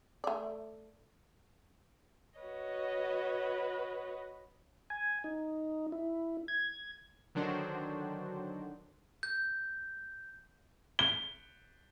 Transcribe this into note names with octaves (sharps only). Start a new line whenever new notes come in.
A3 D5
F#4 B4 C#5 D#5
G#5
D#4
E4
G#6
D3 D#3 F#3 D4 F#4 C5
G6
G7